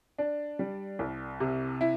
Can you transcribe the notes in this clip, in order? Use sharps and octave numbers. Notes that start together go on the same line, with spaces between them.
D4
G3
C2
C3
E4